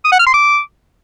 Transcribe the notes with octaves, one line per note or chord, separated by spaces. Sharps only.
D#6
F#5
F6
C6
D6